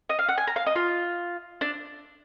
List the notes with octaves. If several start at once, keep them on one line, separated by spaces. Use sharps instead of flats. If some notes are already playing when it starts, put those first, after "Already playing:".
D#5
F5
F#5
G#5
A#5
F5
D#5
F4
D4